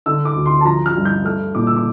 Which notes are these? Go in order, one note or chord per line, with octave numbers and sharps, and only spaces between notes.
D3 E6
D6
D2
C6
A5
F3 A#5
F6
G2
G6
A3 F6
A#2 D6
E6
D6